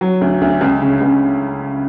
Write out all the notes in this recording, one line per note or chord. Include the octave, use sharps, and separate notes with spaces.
F#3
D2
D2
C#2
C#3
C#2